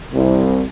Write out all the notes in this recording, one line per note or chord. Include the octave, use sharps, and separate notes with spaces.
C2